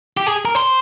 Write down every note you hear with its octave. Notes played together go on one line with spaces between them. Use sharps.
G4
G#4
A#4
C5